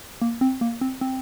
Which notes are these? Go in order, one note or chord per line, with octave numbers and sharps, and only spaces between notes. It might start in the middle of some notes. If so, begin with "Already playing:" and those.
A#3
C4
A#3
C4
C4